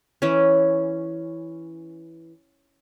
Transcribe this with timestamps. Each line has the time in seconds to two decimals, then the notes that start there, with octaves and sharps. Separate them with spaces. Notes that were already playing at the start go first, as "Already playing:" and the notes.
0.22 E3 C#4